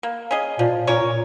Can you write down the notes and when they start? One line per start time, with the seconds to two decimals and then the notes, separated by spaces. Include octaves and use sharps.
0.03 A#3
0.31 C#4 G#4 D#5
0.59 A#2 F3
0.87 A#2 C#4 A#4 C#5
1.02 A#2